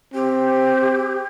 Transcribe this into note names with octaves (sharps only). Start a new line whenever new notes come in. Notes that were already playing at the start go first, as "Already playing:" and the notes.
C4 G4